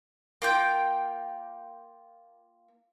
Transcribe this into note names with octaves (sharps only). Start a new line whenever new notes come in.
A#3 F4 G5